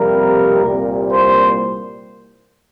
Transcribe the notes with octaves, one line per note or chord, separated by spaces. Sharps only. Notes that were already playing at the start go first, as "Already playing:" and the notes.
Already playing: F2 C3 G3 A#3 A#4
C2 A#2 G3 A#3
C5